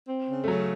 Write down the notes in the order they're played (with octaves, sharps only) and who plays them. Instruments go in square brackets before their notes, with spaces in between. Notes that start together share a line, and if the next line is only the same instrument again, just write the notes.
[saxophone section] C4
C#3
[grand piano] A3
[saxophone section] C#3 [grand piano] F#3